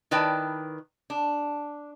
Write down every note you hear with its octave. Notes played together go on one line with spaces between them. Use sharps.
D#3 E4 B4 D5 G5 A5
D4